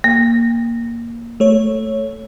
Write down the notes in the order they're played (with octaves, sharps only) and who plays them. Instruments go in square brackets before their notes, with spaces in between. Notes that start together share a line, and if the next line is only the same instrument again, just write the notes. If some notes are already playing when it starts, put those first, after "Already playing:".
[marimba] A#3
[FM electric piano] A3 C#5